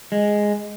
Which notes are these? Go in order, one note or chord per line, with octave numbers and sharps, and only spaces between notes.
G#3